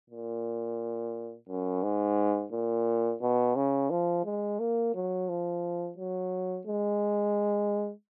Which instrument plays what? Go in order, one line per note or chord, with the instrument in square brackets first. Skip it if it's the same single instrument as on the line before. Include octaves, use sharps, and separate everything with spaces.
[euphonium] A#2
F#2
G#2
A#2
B2
C#3
F3
G#3
A#3
F#3
F3
F#3
G#3